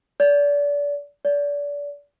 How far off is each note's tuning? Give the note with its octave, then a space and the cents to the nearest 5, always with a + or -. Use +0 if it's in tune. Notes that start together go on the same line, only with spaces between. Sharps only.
D5 -30
D5 -30